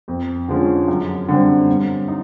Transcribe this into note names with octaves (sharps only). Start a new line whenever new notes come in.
F2
D3 F3 G#3 C#4
F#2
D3 G3 C4
G2
D#4